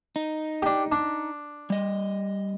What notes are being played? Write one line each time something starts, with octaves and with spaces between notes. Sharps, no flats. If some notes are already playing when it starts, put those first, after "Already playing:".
D#4
D4 G4
D4
G3 D#5